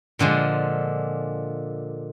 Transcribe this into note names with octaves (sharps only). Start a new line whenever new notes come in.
A#2 D3 F3 G#3